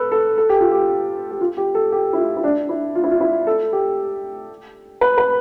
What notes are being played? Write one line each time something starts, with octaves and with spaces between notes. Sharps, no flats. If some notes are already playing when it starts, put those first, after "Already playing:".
Already playing: A4 B4
A4
A4
G4
F4
G4
G4
F4
G4
A4
G4
E4
F4
E4
D4
E4
F4
E4
F4
E4
A4
G4
B4
B4